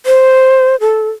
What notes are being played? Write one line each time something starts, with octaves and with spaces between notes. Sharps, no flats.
C5
A4